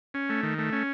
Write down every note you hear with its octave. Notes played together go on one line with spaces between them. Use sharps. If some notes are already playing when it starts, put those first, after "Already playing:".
C#4
A3
D#3
A3
C#4